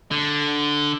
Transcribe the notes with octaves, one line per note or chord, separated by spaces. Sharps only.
D3